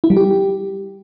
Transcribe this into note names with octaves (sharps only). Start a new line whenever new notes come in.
E4
G3
G4